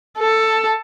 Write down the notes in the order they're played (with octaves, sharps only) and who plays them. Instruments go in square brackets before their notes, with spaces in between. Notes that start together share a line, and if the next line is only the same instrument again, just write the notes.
[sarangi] A4